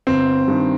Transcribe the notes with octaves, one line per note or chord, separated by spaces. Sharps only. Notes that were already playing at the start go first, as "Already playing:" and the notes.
G1 C4
G2 D#3